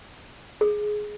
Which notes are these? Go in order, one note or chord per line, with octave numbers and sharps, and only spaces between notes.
G#4